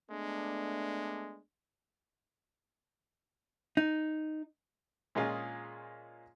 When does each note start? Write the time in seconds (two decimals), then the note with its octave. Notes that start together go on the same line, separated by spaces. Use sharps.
0.11 G#3 A3 B3 D4
3.77 D#4
5.15 A#2 G#3 C#4 F4 G#4